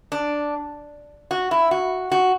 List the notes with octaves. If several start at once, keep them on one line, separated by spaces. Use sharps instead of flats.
D4
F#4
E4
F#4
F#4